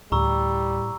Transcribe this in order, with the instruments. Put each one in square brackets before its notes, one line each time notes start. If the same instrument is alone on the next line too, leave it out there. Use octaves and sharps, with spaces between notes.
[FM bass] D2 [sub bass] A2 [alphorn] G3 [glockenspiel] A#5 C#6 E6